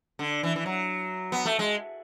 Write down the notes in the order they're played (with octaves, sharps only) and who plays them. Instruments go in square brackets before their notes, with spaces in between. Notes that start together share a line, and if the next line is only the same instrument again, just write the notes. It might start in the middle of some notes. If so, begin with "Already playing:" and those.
[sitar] D3
E3
E3
F#3
B3
A3
G#3